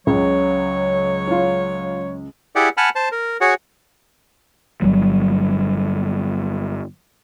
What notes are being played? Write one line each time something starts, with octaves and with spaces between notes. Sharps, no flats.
C#2 C#3 F#3 C#5
C#4 F4
E4 G4 G#4 D5 F#5
F#5 G#5 A5 B5 F6
C5 A5
A#4
F#4 G#4 C#5 F#5
G1 F2 F#3 G3